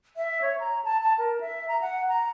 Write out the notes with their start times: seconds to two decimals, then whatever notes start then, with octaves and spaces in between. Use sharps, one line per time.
0.17 E5
0.42 C#5
0.60 A#5
0.85 A5
1.03 A5
1.19 A#4
1.41 E5
1.68 A#5
1.81 F#5
2.08 A#5